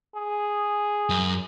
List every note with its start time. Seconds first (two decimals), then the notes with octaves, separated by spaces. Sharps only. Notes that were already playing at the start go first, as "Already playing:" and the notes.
0.15 G#4
1.10 F#2